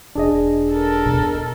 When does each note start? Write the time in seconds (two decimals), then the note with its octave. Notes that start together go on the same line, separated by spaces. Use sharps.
0.15 E1 D4 G#4 D#5
0.72 A4 A#4
1.05 E2 B2